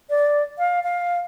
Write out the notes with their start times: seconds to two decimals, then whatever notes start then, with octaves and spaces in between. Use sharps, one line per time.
0.10 D5
0.58 F5
0.84 F5